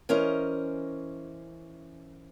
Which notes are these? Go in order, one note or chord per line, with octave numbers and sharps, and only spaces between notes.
E3 C#4 A#4 C5 D#5